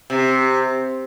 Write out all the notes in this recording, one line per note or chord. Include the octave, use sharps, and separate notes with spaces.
C3